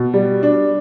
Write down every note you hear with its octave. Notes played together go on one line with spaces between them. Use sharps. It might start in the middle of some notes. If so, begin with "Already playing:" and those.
Already playing: B2
G3
D4